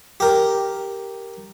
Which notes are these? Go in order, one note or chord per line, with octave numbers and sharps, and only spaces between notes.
G4 A#4